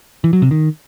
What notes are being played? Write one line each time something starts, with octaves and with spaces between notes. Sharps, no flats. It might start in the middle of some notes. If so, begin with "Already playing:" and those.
E3
F#3
C3
D#3